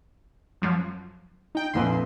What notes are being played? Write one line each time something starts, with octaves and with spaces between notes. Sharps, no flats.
F#2 F3 F#3
D#4 G5
F1 A#1 B4 C6